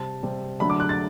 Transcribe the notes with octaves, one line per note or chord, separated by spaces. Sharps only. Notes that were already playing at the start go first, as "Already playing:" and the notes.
Already playing: C3 G3 C4 A5
C3 G3 C4
D3 F#3 A3 D4 B5
D6
F#6
A6